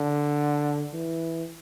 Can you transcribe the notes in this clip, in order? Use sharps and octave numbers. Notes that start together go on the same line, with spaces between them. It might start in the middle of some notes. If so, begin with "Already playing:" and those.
Already playing: D3
E3